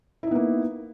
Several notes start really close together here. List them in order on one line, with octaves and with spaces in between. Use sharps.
E4 D#4 B3 A#3